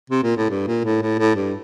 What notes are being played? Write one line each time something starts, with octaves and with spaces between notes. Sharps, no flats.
C3
A#2
A2
G2
A#2
A2
A2
A2
G2